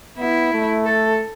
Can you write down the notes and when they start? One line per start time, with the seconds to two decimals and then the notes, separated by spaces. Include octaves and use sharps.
0.19 B3 E4
0.53 A3
0.86 A4